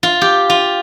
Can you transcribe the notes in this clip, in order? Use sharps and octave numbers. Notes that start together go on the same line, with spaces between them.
F4
G4
F4